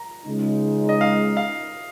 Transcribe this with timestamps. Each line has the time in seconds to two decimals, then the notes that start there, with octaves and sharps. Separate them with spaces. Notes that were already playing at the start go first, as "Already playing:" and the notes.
Already playing: A#5
0.26 C#2 C#3 G#3 D#4
0.89 D#5
1.01 F5
1.37 F5